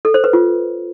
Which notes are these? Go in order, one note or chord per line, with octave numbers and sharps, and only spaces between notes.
A4
C5
B4
F4